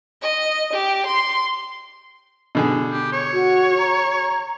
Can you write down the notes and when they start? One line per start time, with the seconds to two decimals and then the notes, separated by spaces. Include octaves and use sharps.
0.22 D#5
0.73 G4
1.06 C6
2.55 B2 D3 G#4
2.91 G4
3.13 C#5
3.34 F#4
3.78 A#5